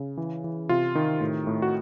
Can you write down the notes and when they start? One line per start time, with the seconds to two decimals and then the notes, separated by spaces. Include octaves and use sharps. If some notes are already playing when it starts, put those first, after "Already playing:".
Already playing: C#3
0.17 E3
0.44 E3
0.69 C3 F4
0.95 D#3
1.21 A2
1.47 A2
1.62 F#4